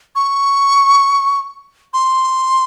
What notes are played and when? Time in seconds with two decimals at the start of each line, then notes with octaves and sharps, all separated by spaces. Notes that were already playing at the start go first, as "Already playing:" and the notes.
0.15 C#6
1.93 C6